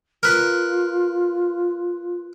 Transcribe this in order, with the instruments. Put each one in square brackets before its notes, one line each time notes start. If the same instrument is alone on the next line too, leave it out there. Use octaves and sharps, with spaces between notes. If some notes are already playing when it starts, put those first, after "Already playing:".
[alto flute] F4 [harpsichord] A#4 B4